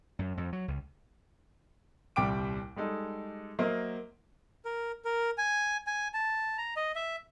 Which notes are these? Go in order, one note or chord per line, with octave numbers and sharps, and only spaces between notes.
F#2
F2
F#3
C#2
D#1 C2 G3 G5 D6 D7
G3 G#3 D#4 A4
F#3 A#3 A#4 C5 D#5 E5
A#4
A#4
G#5
G#5
A5
A#5
D#5
E5